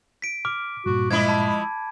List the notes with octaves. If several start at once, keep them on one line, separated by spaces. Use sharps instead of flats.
B6 D7
D6 F6
G2 A#2 F#4
F3 G#3 E4 D#5 B5 G#6
A5 B5